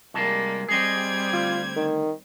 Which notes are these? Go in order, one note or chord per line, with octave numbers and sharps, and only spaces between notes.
C2 G3 G#3 A#3 A5
G3 C4 G#4 D#5 G#6
D2 F4
D#3